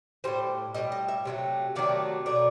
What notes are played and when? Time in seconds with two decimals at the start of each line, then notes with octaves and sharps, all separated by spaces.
0.24 A2 E3 G3 C5
0.74 A2 E3 G3 D#5
0.92 D#5
1.08 E5
1.25 C3 D#3 F#3 A3
1.76 C3 D#3 F#3 A3 D5
2.26 B2 F#3 A3 D5